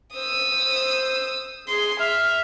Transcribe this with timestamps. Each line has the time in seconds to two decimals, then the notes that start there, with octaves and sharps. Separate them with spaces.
0.15 C5 D#6 E6
0.50 C5
1.68 G#4 C6
2.00 E5 F6